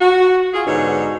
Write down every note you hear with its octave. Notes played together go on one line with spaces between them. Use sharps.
F#4
F4 G#4
G#2 B2 D3 D#4 C#5